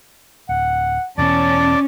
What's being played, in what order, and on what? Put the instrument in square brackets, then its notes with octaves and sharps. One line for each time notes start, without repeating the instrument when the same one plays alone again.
[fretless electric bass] D1 [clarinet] F#5
[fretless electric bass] E2 B2 E3 [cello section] C#4 [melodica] D5 [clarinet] A5